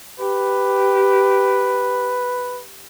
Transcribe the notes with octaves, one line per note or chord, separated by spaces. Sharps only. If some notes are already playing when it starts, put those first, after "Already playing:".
G4 B4